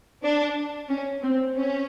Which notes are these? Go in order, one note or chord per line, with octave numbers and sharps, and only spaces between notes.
D4
C#4
C4
C#4